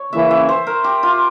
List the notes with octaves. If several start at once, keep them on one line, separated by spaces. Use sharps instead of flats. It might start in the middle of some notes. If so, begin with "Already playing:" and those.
Already playing: C#5
C#3 E3 A#3 C#4 E4 E5
E5
C5
A#4
G4
F4